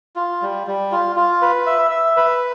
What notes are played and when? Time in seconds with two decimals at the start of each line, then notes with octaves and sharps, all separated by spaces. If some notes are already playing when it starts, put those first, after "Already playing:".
0.16 F4
0.42 G3
0.67 G3
0.92 F4
1.16 F4
1.42 B4
1.66 E5
1.91 E5
2.17 B4